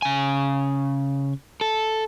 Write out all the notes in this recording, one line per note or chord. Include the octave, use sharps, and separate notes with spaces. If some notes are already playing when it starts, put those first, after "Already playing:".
C#3 G#5
A4